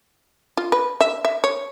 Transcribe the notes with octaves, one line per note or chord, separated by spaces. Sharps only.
F4
B4
E5
E5
C#5